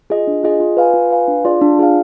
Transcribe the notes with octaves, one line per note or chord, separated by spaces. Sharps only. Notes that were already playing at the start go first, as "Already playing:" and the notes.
F4 G#4 D#5
D4
F4 G#4 D#5
F4
B4 F5 G#5
F4
B4 F5 G#5
D4
F4 G#4 D5 F5
D4
F4 G#4 D5 F5